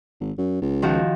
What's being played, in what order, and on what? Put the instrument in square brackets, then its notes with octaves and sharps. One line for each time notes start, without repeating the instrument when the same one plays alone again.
[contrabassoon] G#1
F#2
C#2
[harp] D#3 F3 F#4